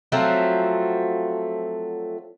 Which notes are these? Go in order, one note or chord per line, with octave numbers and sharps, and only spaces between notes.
F3 F#3 A3 C4